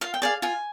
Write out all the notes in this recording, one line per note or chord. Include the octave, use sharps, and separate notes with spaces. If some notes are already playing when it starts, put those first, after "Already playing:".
F4 F5
G5
G#4 D5 F5
F4 G#5